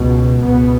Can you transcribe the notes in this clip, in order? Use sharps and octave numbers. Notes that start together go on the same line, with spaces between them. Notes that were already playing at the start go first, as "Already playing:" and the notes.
Already playing: C#2 B2
C#2 B2 B3